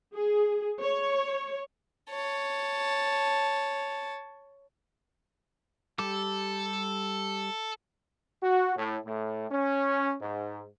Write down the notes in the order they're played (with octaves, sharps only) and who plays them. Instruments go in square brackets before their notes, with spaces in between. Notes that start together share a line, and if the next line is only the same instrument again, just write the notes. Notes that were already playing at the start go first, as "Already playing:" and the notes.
[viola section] G#4
C#5
[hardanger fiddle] C#5 A5
[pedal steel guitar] G3 G4 D6 [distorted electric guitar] A4
[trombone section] F#4
A2
A2
C#4
G#2